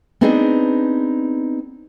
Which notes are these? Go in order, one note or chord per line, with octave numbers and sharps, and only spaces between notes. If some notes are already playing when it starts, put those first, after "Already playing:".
B3 C4 D4 D#4 G#4